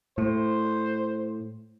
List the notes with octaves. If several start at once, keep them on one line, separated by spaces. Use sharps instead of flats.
A2 C5